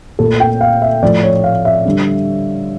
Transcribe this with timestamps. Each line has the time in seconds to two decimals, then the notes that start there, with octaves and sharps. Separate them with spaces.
0.19 A#2 A3 A4
0.40 G5
0.61 F5
0.82 E5
1.02 A2 F3 A3 D5
1.23 C#5
1.44 F5
1.65 E5
1.85 D3 G3